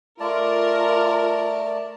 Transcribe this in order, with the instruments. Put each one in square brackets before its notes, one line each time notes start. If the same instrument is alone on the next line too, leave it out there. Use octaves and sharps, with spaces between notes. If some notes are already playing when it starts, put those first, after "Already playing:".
[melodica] A3 D5 A5 [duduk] F4 [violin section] A#4